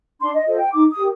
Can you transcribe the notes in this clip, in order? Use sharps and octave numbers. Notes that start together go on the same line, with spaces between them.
D4 C6
D#5
F4 A4 C5 D#5
G5
D#4 D6
D#6
G4 A#4